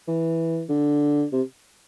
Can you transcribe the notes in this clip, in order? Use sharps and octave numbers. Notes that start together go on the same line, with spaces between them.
E3
D3
C3